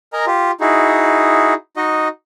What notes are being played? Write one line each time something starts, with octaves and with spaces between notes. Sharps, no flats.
A#4 D#5 G#5 A#5
F4 G4
D#4 E4 F#4 G#4
D#4 F#4 D#5